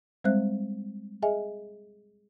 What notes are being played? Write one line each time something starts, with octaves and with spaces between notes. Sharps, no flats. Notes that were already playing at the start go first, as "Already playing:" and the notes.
G3 G#3 C4 C5 E5 F#6
G#4 D#5 E5 G#5